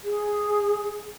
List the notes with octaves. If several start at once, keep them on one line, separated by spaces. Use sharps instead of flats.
G#4